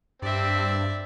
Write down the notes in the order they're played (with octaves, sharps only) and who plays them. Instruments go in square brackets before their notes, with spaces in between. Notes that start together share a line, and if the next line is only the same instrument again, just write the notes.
[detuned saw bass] G2 [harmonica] C4 [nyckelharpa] D5 E5